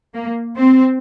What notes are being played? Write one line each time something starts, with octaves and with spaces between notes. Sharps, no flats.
A#3
C4